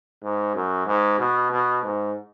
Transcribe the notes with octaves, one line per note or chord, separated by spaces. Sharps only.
G#2
F#2
G#2
B2
B2
G#2